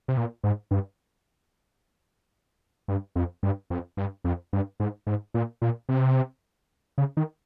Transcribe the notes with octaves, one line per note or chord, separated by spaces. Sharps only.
C3
A#2
G#2
G2
G2
F2
G2
F2
G2
F2
G2
G#2
G#2
A#2
A#2
C3
C#3
D#3